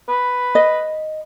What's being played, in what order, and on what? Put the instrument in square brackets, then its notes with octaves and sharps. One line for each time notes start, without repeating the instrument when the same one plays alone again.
[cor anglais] B4
[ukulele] D#5